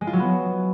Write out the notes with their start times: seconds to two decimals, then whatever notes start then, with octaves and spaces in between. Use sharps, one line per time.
0.01 G#3
0.07 F4
0.13 F#3
0.19 B3